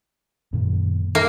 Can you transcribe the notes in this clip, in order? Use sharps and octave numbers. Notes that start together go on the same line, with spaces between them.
F#2 A#2 D#3
A#3